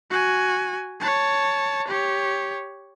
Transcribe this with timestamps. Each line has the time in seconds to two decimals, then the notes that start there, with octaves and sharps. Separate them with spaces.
0.10 F#4 G#5
1.00 C#5 A5
1.87 G4 C#5